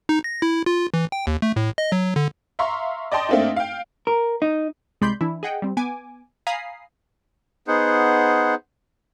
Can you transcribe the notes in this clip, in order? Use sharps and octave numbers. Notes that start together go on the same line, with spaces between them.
D#4
A#6
E4
F4
E3
G5
D#2
A3
A2
D#5
F#3
D3
E5 F5 A#5 C6 C#6
D5 D#5 G5 A5 C6
A3 A#3 C4 D4 D#4
F5 G5
A#4
D#4
C2 G#3 D5 B5 C6 G6
E3 D4 E4
G#4 D#5 F#5 G5
G3 C4
B3 G#5 D6
F5 G#5 A#5 B5 D#6 C7
B3 D#4 G#4 C5 F#5